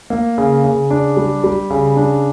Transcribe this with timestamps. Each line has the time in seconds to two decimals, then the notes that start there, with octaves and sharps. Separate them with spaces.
0.10 A#3
0.38 C#3
0.64 C#3
0.91 D4
1.17 G3
1.44 G3
1.70 C#3
1.97 D4